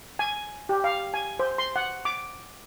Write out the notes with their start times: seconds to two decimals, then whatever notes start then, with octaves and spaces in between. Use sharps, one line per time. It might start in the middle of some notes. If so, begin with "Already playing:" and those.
0.19 G#5
0.69 G4
0.84 F5
1.14 G#5
1.39 C5
1.58 C6
1.76 F#5
2.05 D6